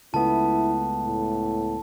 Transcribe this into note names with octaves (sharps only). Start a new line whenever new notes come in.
C#2 A3 B3 E4 A5
A2